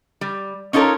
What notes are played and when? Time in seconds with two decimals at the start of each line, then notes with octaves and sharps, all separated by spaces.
0.21 G3
0.73 C#4 D#4 F4 A4 A#4 C#5